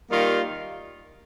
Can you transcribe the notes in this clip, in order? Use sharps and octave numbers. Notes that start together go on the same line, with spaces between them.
D#3 G3 A#3 F4